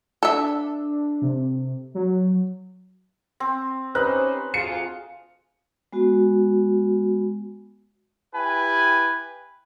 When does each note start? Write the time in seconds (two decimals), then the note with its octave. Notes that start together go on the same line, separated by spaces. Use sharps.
0.23 D4 A4 E5
1.22 C3
1.95 F#3
3.40 C4
3.95 C#4 D#4 G4 B4 C5 F#6
4.54 D2 F4 G#4 C#7
5.93 G#3 B3 F#4
8.35 E4 G4 B4 G5 G#5